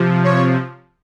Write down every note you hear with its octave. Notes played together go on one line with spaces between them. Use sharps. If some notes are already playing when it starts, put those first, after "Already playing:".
Already playing: C3 F3
C#5